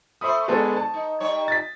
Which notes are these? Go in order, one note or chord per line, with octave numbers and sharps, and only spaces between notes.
A3 C5 E5 B5 D#6
D3 G#3 B3 A4
A5
D#4
G3 D#4 C#5
A6 B6